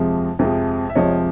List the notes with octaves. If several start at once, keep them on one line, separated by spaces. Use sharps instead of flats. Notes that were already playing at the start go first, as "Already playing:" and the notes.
Already playing: F2 C3 F3 G#3
F2 C3 F3 G#3
E5
F2 C3 F3 G#3 C#5 D#5